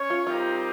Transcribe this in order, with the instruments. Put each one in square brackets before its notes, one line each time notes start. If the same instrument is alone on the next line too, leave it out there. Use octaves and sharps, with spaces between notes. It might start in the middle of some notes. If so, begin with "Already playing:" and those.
Already playing: [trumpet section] C#4 C#5
[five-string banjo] F4
[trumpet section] G3 C4 D#4 G4 A#4 [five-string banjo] F4